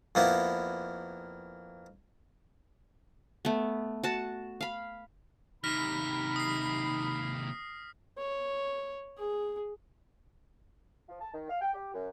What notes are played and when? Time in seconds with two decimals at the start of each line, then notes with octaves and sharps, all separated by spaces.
0.15 F2 A#3 B3 E4
3.45 A3 B3
4.03 F#4 F#5 A5
4.61 F5 B5
5.64 D#2 C3 D#4 B5 F6 A#6 B6
6.36 D#6 C7
8.18 C#5
9.18 G#4
11.09 F3
11.21 A5
11.34 D#3
11.49 F5
11.61 G5
11.73 G4
11.94 F#2